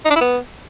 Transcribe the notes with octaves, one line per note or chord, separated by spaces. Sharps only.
D#4
D4
E4
B3